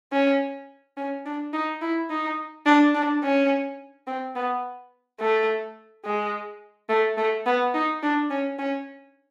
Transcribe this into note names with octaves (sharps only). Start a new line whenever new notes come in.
C#4
C#4
D4
D#4
E4
D#4
D4
D4
C#4
C4
B3
A3
G#3
A3
A3
B3
D#4
D4
C#4
C#4